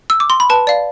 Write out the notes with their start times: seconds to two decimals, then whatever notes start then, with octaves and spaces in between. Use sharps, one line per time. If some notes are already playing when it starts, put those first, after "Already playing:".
0.10 E6
0.20 D6
0.30 C6
0.40 B5
0.50 B4 A5
0.67 D5 F5